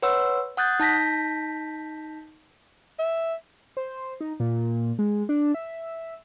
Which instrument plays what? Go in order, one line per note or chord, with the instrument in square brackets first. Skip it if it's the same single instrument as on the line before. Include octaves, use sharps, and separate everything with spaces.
[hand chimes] B4 C#5 F#5 C6 E6
F#5 D#6 F#6 G6 A6
D#4 A5 G6 A#6 B6
[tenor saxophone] E5
[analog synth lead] C5
D#4
A#2
G#3
D4
E5